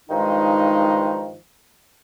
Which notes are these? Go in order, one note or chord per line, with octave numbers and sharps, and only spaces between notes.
G2 D#3 F3 G#3 D#4